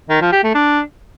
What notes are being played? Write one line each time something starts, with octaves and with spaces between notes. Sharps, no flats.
D#3
F3
G4
A3
D4